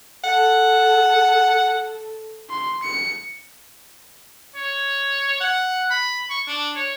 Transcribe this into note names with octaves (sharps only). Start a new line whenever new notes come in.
A4 F#5
C6
C#7
C#5
F#5
B5
C#6
D4
C#5